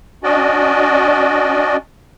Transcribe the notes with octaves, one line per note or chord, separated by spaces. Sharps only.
C#4 D4 F#4 D5 D#5